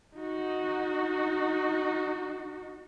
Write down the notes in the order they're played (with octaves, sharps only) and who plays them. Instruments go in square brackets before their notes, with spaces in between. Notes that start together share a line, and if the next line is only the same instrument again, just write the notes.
[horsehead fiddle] D#4 F#4